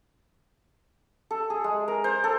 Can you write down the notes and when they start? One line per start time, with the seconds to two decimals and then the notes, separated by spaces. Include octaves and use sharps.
1.31 A4
1.50 G#4
1.64 G#3
1.88 A#4
2.04 C5
2.24 A4